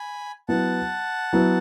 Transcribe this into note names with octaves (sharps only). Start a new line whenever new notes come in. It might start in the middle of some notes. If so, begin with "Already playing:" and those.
Already playing: G#5 B5
F#3 B3 E4 F#5 A5
F#3 B3 E4